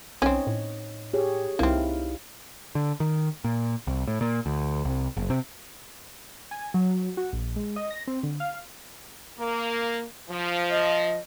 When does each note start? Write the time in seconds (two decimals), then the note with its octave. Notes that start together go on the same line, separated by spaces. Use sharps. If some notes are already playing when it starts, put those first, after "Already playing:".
0.22 B1 C4 C#4 D#4 C#5 D#5
0.47 A2
1.14 G4 G#4 C#5
1.59 C2 A#3 C4 D#4 E4 F5
2.75 D3
3.00 D#3
3.44 A#2
3.87 C2
4.07 A2
4.21 A#2
4.46 D2
4.85 C2
5.17 F#1
5.30 C3
6.51 G#5
6.74 F#3
7.17 F#4
7.33 A#1
7.56 G#3
7.76 D#5
7.91 A#6
8.07 C4
8.23 D3
8.40 F5
9.38 A#3
10.30 F3
10.70 D#5